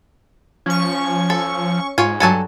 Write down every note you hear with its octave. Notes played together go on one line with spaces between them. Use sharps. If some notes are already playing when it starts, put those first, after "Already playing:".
F3 C#4 C#6
A4
G#2 F4 C#5 G#5
G2 F#3 A4 G#5 A5